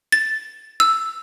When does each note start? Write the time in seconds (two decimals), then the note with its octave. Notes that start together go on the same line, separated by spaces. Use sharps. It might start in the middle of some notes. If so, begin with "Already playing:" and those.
0.12 A6
0.80 E6